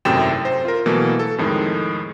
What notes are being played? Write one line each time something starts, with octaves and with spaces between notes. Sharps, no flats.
G#1 F#2 A2 C3 G5 E7
C5
F4 A#4
B2 E3 F#3 A3 A#3
A4
F2 A2 D#3 G#3